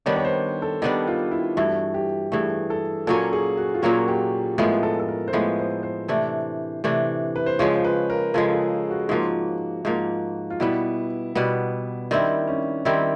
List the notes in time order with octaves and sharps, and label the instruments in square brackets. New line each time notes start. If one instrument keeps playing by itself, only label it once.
[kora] D#3 G3 B3 D4 [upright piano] C#5
[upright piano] C#5
C5
A4
[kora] D#3 G3 B3 D4 [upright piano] G4
[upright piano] F4
E4
[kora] G2 E3 A3 [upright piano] F#4
[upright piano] G4
[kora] G2 E3 A3 [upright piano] G#4
[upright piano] A4
[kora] A#2 F#3 A#3 C#4 [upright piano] A4
[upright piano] G#4
F#4
F4
[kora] A#2 F#3 A#3 C#4 [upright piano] F#4
[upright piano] G4
[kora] A2 F3 G#3 B3 [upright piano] A#4
[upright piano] A4
A4
A#4
C5
[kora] A2 F3 G#3 B3 [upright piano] B4
[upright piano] C5
C5
[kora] C3 E3 A3 D4
C3 E3 A3 D4
[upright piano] B4
C5
[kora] C#3 F3 G#3 [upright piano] C#5
[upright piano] C5
B4
A#4
[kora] C#3 F3 G#3 [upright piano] A4
[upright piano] G#4
F#4
[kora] G#2 F3 A#3 [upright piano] F#4
[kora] G#2 F3 A#3
[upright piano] F4
[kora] B2 G3 B3 [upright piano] E4
[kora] B2 G3 B3
[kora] D#3 G3 C4 E4 [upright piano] D4
[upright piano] C#4
[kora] D#3 G3 C4 E4 [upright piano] D4